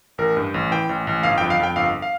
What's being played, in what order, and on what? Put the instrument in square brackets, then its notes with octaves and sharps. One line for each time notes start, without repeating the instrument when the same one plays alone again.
[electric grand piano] A1 A#4
G2
A1
E3 G5
A1
A1
G1 F5
G5
F2
F5
F2 G5
G1 F5
F5